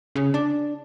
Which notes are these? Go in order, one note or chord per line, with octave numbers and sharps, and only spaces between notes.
C#3
D4